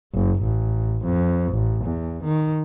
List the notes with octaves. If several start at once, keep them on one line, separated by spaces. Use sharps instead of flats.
F#1
A1
F2
A1
E2
D#3